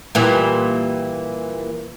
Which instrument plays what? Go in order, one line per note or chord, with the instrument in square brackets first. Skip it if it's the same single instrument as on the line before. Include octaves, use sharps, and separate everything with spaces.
[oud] A#2 E3 G3